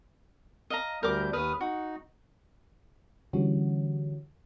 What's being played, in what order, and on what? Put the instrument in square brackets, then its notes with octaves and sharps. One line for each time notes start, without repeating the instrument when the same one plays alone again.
[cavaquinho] D#5 F5 A#5
[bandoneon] D2 G3 G6 [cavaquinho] A#4 D6
[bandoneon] D#2 D#6 F6 [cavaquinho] B4
[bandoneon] D#4 [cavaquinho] F#4
[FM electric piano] D3 E3 G3 C#4 F#4